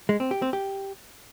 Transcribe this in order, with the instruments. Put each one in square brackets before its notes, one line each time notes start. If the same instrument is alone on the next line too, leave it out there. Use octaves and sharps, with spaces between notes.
[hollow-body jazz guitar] G#3
C4
G4
C4
G4